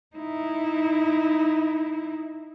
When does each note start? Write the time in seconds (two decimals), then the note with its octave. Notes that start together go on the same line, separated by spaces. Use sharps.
0.16 D#4 E4